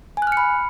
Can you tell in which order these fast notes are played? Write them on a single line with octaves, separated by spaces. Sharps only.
G#5 F#6 F6 C#7 B5